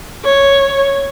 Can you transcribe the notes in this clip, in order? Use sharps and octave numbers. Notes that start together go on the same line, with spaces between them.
C#5